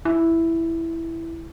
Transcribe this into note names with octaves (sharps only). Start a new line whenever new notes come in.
E4